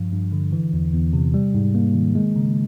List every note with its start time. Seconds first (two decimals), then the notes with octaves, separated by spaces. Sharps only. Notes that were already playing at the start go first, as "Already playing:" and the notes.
Already playing: G2 F3
0.12 G2
0.33 D3
0.52 E3
0.73 E2
0.94 E2
1.13 C3
1.34 G3
1.54 G#2
1.75 A#3
1.94 D#3
2.15 G#3
2.36 C#3